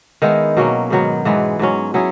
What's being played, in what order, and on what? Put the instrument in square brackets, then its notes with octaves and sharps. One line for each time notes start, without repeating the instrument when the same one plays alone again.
[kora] D#3 G#3 B3 E4
B2 F#3 A#3 C#4
G#2 D#3 F#3 B3
G#2 E3 G#3 B3
G#2 F#3 C#4
F#3 C#4 E4 G#4